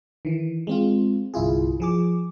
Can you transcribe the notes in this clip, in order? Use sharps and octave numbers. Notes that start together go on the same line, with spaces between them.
D#3 E3
G#3 C4 F4
G1 C2 E4 F4 G#4
F3 G#4 D6